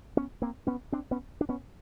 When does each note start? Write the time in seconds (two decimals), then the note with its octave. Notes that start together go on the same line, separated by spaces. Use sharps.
0.17 B3 C#4
0.42 A#3 C4
0.67 B3 C#4
0.92 C4 D4
1.11 B3 C#4
1.41 D4
1.49 B3 C#4